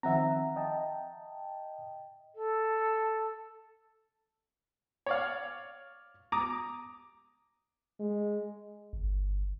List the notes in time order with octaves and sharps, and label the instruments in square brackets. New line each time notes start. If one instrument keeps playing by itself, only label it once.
[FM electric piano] D#3 F3 C4 [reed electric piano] E5 F#5 A#5
[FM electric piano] D#5 G5 A5
[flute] A4
[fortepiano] C#5 D5 F5
A#5 D6 D#6
[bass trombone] G#3
[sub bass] G1